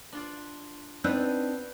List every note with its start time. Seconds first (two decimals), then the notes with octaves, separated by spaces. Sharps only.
0.12 D4 F4 D5
1.04 B3 C4 D4 D#4 E6 F#6 G6